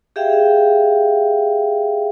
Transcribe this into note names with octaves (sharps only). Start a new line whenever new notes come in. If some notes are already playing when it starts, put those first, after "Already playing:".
G4 G#4 E5 F5 G5